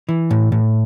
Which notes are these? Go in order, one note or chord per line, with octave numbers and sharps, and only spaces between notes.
E3
A2
A2